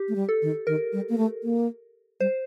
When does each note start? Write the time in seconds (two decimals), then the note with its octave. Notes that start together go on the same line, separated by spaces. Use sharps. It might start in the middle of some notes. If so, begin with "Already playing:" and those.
Already playing: G4
0.08 A3
0.16 G3
0.29 A4
0.42 D#3
0.67 D#3 A#4
0.93 G3
1.09 A#3
1.18 A3
1.44 A#3
2.20 G3 C5